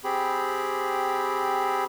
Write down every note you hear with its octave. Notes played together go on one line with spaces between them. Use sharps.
C4 G4 G#4 B5